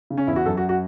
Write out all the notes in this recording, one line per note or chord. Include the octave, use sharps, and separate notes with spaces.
C#3
C#4
E2 E4
F#4
F#2 A4
F#4
F#4